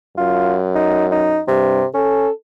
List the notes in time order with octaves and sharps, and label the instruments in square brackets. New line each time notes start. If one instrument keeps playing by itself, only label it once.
[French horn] F#2 [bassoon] F4
[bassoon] D#4
D#4
[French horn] G2 [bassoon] C3
[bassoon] C#4 [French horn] A4